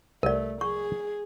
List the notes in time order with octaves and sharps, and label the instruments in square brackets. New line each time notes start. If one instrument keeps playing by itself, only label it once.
[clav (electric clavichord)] C2 [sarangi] A3 [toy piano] A#4 D5
[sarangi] G#4 [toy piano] C#6